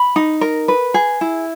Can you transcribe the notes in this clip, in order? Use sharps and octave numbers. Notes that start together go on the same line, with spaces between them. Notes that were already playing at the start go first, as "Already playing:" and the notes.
Already playing: B5
D#4
A#4
B4
G#4
E4